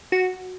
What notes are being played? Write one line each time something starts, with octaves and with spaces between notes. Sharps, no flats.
F#4